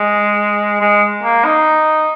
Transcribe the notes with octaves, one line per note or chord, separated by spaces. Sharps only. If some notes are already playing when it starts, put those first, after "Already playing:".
Already playing: G#3
G#3
A#3
D#4